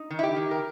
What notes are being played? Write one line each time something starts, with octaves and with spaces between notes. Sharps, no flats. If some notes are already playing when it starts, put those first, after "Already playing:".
Already playing: D#4
D#3
E4
G4
D#3
A#4